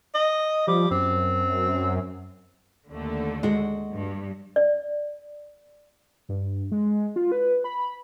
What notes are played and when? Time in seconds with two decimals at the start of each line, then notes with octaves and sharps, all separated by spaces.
0.14 D#5
0.68 F3 G3
0.91 F#2 C4
2.89 D#2 D3 A3
3.43 G#3 F#4
3.94 G2
4.56 D5
6.29 G2
6.72 G#3
7.16 F4
7.32 B4
7.64 B5